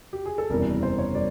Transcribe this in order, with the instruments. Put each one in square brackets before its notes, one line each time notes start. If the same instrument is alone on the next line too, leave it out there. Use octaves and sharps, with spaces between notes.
[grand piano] G4
G#4
A4
F#1 E2 C3 E3 G3 A#4
C5
C#5
G3 D5